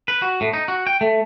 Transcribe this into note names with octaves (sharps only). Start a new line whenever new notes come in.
B4
F#4
A2
D#4
F#4
G5
A3